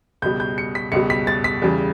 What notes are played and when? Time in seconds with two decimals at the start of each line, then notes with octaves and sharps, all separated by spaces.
0.22 C#2 B2 G3 G6
0.40 G6
0.58 C#7
0.75 B6
0.92 C#2 B2 G3 C#7
1.10 B6
1.27 A6
1.44 B6
1.62 E2 C#3 G3